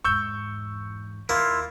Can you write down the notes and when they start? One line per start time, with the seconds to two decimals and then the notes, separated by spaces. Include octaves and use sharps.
0.04 E2 G#2 C#6 E6 G6
1.29 D#2 A#3 E4 F4